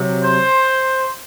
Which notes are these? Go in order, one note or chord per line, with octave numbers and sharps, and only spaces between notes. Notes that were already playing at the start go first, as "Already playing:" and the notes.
Already playing: C3 F#3
C5